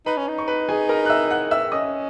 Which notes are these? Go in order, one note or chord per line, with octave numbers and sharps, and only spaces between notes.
D#4 B4 B5
C#4
D#4
C#6
B4 B5
G#4 G#5
A#4 A#5
F#6
E5 E6
F#5 F#6
E5 E6
C#4 D#5 D#6